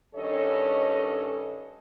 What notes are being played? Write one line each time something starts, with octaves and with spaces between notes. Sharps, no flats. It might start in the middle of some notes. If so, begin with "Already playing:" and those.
G2 D#3 C#4 A4 C#5 D#5